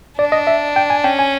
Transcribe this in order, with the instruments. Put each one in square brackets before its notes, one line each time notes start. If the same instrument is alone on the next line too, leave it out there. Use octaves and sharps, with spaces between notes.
[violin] D4 [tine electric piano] D5
[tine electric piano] D#5
E5
G5
G#5
[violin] C#4 [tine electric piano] G5
[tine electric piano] G#5